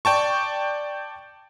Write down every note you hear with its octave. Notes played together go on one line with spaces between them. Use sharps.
D5 G5 A5 C#6